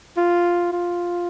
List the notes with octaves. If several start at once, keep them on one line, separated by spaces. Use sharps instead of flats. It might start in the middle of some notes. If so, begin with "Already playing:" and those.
F4
F4